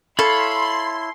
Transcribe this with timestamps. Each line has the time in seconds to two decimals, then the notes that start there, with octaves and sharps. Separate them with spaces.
0.19 E4 A4 C#5 F5 B5 C6